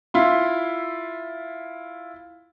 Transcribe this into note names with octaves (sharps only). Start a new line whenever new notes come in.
E4 F4 C6